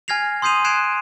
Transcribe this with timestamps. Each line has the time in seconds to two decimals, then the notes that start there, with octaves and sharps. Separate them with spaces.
0.08 G#5 F6 G#6 A#6 C7 F7
0.42 C6 D#6 G6 C7 D#7 F7
0.64 F#6 G#6 C7 D7 E7 F7